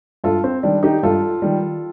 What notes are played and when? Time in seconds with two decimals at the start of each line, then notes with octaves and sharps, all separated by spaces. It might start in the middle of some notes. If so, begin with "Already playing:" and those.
0.24 G2 F4 A4
0.44 C4
0.63 D#3 G3 D4
0.83 D#4 G4
1.03 G2 F4 A4
1.42 D#3 G3